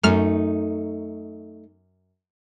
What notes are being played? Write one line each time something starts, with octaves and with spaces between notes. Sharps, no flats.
F#2 A3 D#4 F6